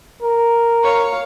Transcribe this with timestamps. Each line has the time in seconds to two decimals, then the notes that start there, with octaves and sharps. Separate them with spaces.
0.22 A#4
0.83 C#5 F5